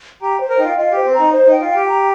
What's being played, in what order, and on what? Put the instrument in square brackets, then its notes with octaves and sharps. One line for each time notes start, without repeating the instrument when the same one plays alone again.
[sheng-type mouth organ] G4 [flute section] A#5
[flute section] C5
[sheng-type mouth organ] A#4
[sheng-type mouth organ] D#4 [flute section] G5
[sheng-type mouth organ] F4
[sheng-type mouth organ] F4 [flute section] D#5
[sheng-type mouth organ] G4 [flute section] C5
[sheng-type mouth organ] C4
[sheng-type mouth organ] D#4 [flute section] A#5
[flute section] C5
[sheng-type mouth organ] D#4 [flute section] G5
[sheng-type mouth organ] F4
[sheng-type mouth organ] G4 [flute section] G5
[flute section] A#5